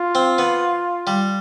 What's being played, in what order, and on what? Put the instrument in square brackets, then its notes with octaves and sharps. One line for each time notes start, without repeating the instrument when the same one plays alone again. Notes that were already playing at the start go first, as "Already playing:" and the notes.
Already playing: [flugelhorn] F4
[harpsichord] C4
B3
G3